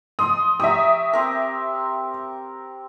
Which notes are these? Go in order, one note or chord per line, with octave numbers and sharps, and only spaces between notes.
C6 D#6
G4 C#5 E5 A#5 D#6
C4 A#4